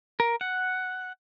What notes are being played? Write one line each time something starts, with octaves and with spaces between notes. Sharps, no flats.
A#4
F#5